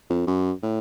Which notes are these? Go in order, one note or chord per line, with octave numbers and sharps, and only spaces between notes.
F2
F#2
A2